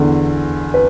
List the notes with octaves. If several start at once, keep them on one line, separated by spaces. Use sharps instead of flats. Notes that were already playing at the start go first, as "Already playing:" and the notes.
Already playing: E2 D3 A4
B4